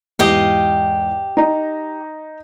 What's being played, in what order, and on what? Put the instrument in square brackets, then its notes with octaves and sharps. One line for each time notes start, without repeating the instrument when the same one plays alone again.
[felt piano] E2 G#2 [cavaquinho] G4 D#5 F5
[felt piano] D#4 A#5